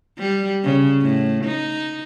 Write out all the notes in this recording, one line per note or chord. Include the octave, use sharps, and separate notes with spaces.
G3
C#3
A2
D#4